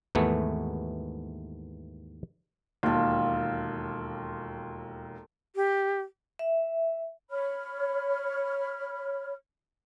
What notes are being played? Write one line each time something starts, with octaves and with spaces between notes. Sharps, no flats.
D#2 G#2 E3 A3 B3
E1 D#2 F4 A4
G4
E5
C#5 B5 F6